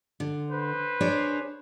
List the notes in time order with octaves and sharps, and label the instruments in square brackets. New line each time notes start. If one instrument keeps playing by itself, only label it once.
[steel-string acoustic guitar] D3
[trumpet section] B4 C5
[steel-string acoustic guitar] D4 G#4 C#5